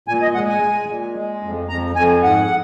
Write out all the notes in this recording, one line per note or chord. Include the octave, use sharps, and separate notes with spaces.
A#2 G#5
D#5
G#3 F#5
G#5
G#3
A#2
G#3
F2
F2 A#5
F2 G#5
G#2 F#5